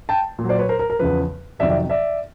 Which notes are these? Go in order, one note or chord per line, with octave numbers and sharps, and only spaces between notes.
G5 A5
A#2
F#3
C5 D5
B4 C#5
A#4 C5
A#4
A#4
E2 C#3 F3 B4
F2 C3 D#3 F#3 D5 E5
D5 E5
D5 E5